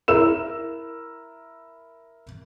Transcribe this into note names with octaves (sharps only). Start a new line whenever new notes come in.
E4 A#4 E6 E7